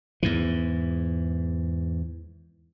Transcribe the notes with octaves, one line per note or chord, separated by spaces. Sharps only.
E2 G#2 E3